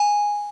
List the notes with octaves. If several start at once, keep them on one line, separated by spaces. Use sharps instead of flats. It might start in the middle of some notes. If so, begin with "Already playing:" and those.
Already playing: G#5